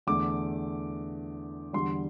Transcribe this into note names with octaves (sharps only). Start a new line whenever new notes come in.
E2 D3 A3 D6
E2 D3 G3 C6